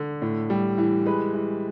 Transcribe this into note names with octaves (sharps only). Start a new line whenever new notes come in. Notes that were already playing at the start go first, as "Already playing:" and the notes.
Already playing: D3
A2
G3
E3
G#3 B4
E3